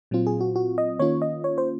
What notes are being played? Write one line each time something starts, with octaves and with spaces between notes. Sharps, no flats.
A#2 F#3 C4 F4
G#4
F#4
F#4
D#5
D#3 A#3 C#4 F4 C#5
D#5
C#5
C5